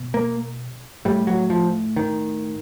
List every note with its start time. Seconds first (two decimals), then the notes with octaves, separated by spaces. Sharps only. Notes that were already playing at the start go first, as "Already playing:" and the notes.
Already playing: B2
0.14 A#3
1.05 A2 G3
1.27 F#3
1.50 F3
1.96 D#3